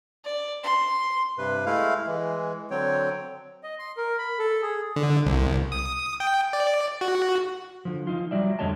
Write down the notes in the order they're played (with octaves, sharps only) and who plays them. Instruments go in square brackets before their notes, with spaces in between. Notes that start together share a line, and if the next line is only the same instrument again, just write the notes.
[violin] D5
C6
[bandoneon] G2 C3 B4
G#3 A3 E4 F5
E3 G#3
D3 F#3 C4 C#5 G5
[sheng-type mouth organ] D#5
C6
A#4
B5
A4
G#4
[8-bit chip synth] D3
C2
D#6
G5
D5
F#4
[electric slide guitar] D3 F3
F3 D#4 F4
F#3 G3 D5 E5
F2 D3 G#3 C#5 D#5 A5